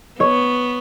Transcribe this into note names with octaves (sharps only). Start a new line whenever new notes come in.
B3 C#5